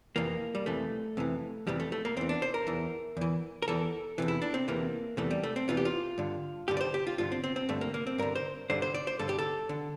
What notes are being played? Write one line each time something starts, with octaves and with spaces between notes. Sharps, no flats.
F2 C3 E3 A#3
G3
F2 C3 E3 A3
F2 C3 E3
F2 C3 E3 G3
A3
A3
A#3
E2 E3 C4
D4
C5
A#4
E2 E3
E2 E3
A#4
E2 E3 A4
E2 C3 E3
E4
D4
C4
E2 C3 E3 A#3
E2 C3 E3 A3
G3
A3
C4
E2 C3 E3 F4
G4
F4
G2 D3
G2 D3 G4
D5
C5
G4
F4
G2 D3 F4
C4
C4
C4
G2 D3 A3
A#3
A#3
C4
G2 D3 A#4
C5
G2 D3 C5
C5
D5
C5
G2 D3 A4
G4
A4
D3